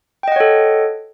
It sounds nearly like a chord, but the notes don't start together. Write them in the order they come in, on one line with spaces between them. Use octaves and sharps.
G5 D#5 F#5 C#5 A4